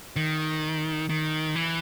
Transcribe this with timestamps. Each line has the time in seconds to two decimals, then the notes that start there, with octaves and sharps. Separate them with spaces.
0.16 D#3
1.10 D#3
1.55 E3